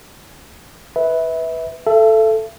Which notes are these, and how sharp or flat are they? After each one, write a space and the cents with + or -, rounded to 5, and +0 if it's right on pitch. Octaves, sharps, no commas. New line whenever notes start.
B4 +0 E5 -25
A4 +0 E5 +40